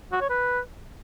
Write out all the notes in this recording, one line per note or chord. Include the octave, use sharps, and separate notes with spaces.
F#4
C#5
B4